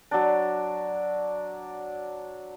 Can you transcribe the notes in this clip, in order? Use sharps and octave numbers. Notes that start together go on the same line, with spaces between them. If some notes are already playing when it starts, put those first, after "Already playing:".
F#3 D4